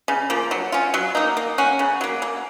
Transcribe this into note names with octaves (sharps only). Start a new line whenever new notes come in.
C#3
F3 A#3
F#3
C#4 F4
F#3
A#3 D#4
A#3
C#4 F#4
C#3
F#3 A#3
A#3